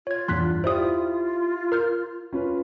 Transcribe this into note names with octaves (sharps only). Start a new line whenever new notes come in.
F4 C#5 G#6
E2 G2 C6 F#6 B6
E4 F4 G4 C5 D5 D#6
A#4 F6 G6
C#4 F4 B4